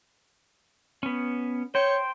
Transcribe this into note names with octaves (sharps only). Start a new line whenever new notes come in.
B3 C#4
C5 C#5 G5